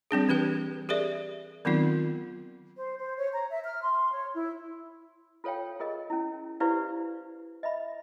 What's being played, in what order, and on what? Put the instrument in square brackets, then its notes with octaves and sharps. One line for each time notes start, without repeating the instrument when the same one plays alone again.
[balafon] G3 C4 D4 G#4
E3 G4 B4 G5
G4 G#4 A#4 D5 E5
D#3 F#3 B3 C4 D#4 F4
[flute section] C5
C5
C#5
A#5
E5
F6
C6
C#5
E4
[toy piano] F4 A4 C#5 F5 G5
F4 G#4 A#4 D#5
C#4 E4
E4 G4 B4 C5 D5 F5
D#5 E5 B5